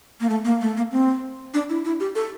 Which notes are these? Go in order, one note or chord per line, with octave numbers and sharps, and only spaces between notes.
A#3
A3
A#3
A3
A#3
C4
D4
E4
E4
G4
A4